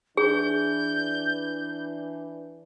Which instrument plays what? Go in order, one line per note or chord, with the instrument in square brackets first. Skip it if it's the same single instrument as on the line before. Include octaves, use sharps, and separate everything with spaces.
[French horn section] E3 D4 [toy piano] G#4 [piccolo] G6